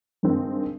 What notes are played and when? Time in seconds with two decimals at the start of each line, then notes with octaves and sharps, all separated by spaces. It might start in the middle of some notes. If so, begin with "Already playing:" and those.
0.23 G2 D#3 G#3 C4